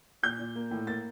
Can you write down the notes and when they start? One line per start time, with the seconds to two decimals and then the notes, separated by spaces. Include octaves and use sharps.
0.23 A#2 G6
0.39 A#2
0.56 A#3
0.71 A2
0.87 A#3 A6